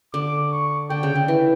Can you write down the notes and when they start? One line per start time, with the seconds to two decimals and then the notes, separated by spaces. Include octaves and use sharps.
0.14 D3 D6
0.52 C#6
0.90 D3 G5
1.03 C#3
1.15 D3
1.28 E3